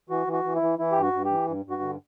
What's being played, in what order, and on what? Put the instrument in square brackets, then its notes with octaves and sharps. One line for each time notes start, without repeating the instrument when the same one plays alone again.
[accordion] E3 F#4
E3
F#4
E3
E4
E3
E3 E4
G2 G4
F#4
G2
G4
E3
G2
G2 F#4
D3